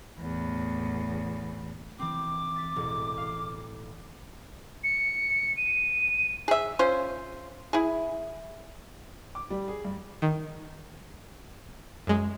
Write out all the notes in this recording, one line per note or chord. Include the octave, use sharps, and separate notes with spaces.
E2 A2
E3 C4 D6
A6 B6
E1 A1
F5
C#7
D#7
G#4 E5
C#4 F4 C5
E4 G#4
D6
G3
G#4
G2
D#3
F#2 G#3